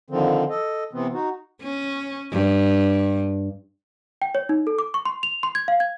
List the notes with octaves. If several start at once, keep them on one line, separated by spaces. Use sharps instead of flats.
D3 D#3 F3 C4
A4 D#5
C3 E3 B3 C4
D#4 F#4
C#4
G2
G5
C#5
D#4
A4
D6
C#6
C6
F7
C6
G#6
F5
G#6